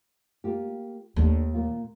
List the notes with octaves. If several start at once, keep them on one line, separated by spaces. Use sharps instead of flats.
A#3 F4 G4
D#2 A3 D4
A#2 A#3 F4